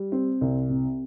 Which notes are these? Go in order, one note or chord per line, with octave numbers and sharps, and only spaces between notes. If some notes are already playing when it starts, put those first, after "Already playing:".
Already playing: G3
C4
C2
C3